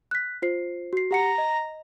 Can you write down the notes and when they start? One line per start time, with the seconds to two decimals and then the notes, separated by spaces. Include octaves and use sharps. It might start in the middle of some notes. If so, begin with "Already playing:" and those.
0.11 F#6 B6
0.42 F4 C5 C7
0.93 F#4 C7
1.11 G4 F#5 A#5 C#7
1.38 D#5